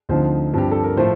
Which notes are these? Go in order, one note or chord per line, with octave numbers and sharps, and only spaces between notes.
D2 D3 F3 C4 D#4 C5
G2 F3 C4 G4
A4
A#4
A2 F3 A3 C5